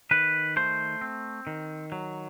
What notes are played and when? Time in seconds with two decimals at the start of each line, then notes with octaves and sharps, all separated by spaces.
0.11 D#3 B4
0.56 A3 C5
1.01 C4
1.47 D#3
1.92 F#3